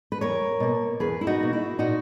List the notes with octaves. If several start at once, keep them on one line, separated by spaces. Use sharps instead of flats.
B4
E2 A#4 C#5
B2 A#3
E2 G#4 B4
E4
D#4 F#4
B2 A#3
E4
A#2 D#4 F#4